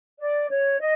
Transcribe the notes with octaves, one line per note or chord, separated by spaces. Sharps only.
D5
C#5
D#5